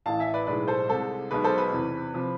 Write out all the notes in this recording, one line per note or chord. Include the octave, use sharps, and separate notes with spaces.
A1 A2 E3 F5 A5
E5 G#5
B4 D5
B1 A2 G#3 B4 D5
A4 C5
C2 C3 G#3 A4
B1 B2 G#3 B4
A4 C5
B4
E2 C3 E3
C3 F3